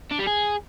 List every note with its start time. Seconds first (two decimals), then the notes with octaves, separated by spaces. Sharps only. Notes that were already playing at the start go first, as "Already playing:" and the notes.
0.12 D4
0.19 G3
0.27 G#4